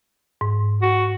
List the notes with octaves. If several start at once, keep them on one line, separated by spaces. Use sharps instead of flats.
G#2
F#4